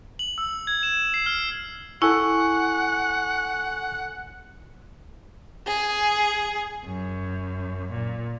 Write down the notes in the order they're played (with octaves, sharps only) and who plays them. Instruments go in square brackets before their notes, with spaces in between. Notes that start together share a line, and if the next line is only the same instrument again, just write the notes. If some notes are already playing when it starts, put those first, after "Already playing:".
[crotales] F#7
E6
G#6
E7
C7
F6
[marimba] E4 [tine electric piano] A4 G#5 C#6 [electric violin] F#5
[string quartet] G#4
F#2
A#2